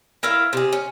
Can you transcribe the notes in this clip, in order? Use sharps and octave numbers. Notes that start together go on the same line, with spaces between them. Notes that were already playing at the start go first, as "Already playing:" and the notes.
E4 A#4 E5 F5
C3 G#4
C#4